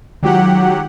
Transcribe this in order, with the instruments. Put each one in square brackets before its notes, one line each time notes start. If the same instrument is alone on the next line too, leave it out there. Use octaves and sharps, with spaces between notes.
[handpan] D#3 G#3 F4 [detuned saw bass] F#3 [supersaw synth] G4 F#5